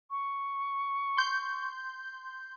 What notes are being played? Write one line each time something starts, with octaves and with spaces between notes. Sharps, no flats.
C#6
C6 G6